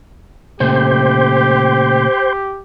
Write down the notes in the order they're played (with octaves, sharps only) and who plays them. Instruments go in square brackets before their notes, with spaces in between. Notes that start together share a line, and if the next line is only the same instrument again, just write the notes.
[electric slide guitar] A#2 C#3 A3 [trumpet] G4 [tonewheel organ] C5 G5